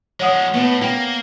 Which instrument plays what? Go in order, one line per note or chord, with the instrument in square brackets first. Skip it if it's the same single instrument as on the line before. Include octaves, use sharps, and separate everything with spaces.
[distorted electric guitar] F3 G#3 [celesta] C#5 F#5 D#6
[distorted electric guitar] A2 A3 [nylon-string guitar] B3
[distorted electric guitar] A#3 [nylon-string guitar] G5